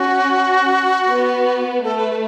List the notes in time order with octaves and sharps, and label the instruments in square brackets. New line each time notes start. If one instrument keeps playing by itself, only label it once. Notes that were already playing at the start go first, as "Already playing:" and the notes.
Already playing: [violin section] C#4 [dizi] F#4
[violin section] B3
[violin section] A3 [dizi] A4
[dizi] B4
B4